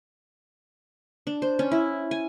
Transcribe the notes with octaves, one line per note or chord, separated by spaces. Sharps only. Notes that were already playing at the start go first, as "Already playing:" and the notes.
D4
C5
C#4
E4
G#5